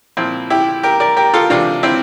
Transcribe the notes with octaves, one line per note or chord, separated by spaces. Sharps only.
A#2 F3 C4 E4
E4 G4
G4 A#4
A#4 D5
G4 A#4
F4 A4
C3 E3 D4 F4
C4 E4